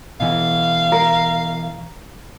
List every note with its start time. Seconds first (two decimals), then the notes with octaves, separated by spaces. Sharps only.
0.20 B2 E3 F5
0.92 A#4